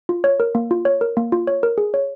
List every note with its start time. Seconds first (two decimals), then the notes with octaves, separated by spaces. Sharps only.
0.09 F4
0.24 C#5
0.40 A#4
0.55 A#3
0.71 F4
0.85 C#5
1.01 A#4
1.17 A#3
1.32 F4
1.47 C#5
1.63 A#4
1.78 G#4
1.94 C#5